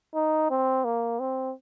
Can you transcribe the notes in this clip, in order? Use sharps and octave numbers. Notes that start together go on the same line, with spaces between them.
D#4
C4
A#3
C4